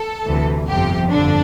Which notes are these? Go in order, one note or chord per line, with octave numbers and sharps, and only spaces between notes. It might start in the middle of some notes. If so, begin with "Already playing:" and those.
Already playing: A4
D2 C3 E3
G1 F2 C3 F3 G4
G1 F2 D3 D4